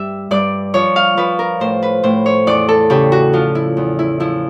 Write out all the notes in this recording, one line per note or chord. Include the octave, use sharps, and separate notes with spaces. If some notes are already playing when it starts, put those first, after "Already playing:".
Already playing: G2 G3 E5
G2 D5
F3 C#5
F5
F3 B4
A#4
A2 C5
B4
A2 C5
C#5
E2 D5
A4
C#3 G4
F#4
F3 F4
E4
E2
E4
F3 E4